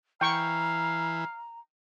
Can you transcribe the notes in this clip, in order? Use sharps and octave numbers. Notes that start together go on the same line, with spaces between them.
E3 F5 G5 A#5 C#6